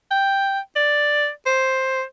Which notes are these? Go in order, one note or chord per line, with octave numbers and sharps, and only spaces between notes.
G5
D5
C5